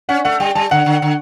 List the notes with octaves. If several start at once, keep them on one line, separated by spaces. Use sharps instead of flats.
C#4 F#5
A3 F#5
G3 G5
G3 A5
D3 F#5
D3
D3